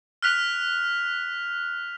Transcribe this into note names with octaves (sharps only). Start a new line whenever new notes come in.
F6 F#6 B6 F7